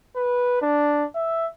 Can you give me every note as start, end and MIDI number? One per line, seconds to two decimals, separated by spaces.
0.16 0.57 71
0.61 1.05 62
1.15 1.47 76